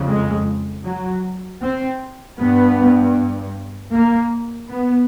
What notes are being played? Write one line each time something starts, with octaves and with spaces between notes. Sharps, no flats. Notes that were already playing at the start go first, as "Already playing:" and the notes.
Already playing: F2 C#3
G#3
F#3
C4
G2 B3
A#3
B3